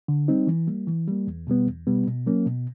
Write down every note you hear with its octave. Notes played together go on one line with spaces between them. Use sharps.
D3
G3 C4 D#4
E3
G3 A#3
E3
G3 A#3
E2
B2 G3 B3
E2
B2 G3 B3
B2
F#3 A#3 C#4
B2